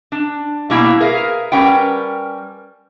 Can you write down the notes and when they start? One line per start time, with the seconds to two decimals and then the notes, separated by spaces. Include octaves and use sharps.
0.12 D4
0.70 B2 G3 A#3 E4
1.00 G#4 A#4 B4 E5 F5
1.52 G3 C#4 A#4 B4 F#5 G5